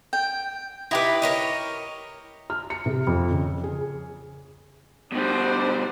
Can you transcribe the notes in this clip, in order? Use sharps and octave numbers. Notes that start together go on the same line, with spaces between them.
G5
D#4 E4 G4 B4 D6
A#4 C#5 D#5
F6
C#7
C3
F2
C#3
G#4
B2 G3 D4 C5